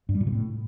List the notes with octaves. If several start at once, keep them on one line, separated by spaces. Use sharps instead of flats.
G2
G3
A#2
B2
A2